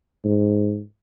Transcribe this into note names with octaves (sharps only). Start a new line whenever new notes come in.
G#2